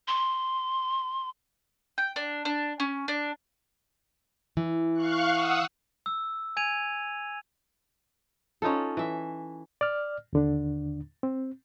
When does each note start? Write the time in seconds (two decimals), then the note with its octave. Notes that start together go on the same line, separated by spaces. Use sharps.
0.07 C6
1.98 G5
2.16 D4
2.45 D4
2.80 C#4
3.08 D4
4.57 E3
4.94 F5 C#6 F#6
5.31 F#5 D#6 E6
6.06 E6
6.57 G#5 G#6 D#7 F7
8.62 C#4 D#4 F4 A4
8.97 E3 E5
9.81 D5 F6
10.33 D#2 D3 D4
11.23 C4